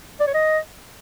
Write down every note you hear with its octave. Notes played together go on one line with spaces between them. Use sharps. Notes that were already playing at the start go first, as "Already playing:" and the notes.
D5
C#5
D#5